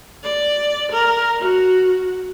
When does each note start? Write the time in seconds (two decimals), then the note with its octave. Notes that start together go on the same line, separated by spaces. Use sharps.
0.23 D5
0.92 A#4
1.40 F#4